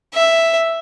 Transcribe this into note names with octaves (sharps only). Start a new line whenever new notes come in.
E5